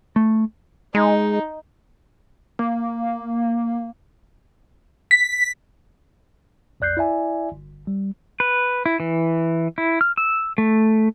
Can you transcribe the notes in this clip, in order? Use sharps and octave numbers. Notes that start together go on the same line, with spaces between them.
A3
G#3 D#4
A#3
B6
B1 F2 D5 F#6 G6 C7
E4 D5 E5 G#5
G1
G3
B4
E4
E3
E4
F6
E6
A3